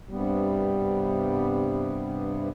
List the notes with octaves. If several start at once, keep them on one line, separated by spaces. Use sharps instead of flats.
G2 C3 G3 B3